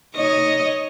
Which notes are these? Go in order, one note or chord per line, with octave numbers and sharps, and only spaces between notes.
D#4 C#5 D#5